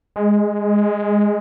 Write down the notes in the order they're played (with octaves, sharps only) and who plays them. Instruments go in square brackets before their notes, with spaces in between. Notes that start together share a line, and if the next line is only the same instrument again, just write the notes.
[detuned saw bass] G#3